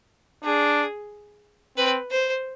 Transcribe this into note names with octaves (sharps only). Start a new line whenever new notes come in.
D4 G#4
C4 B4
C5